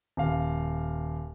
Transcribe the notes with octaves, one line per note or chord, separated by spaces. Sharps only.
D#1 F5